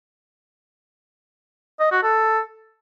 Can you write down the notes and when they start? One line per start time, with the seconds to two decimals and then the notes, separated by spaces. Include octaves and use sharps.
1.80 D#5
1.91 F#4
2.03 A4